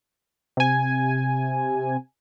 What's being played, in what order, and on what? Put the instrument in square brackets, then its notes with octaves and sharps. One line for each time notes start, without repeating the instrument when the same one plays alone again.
[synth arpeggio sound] C3 G#5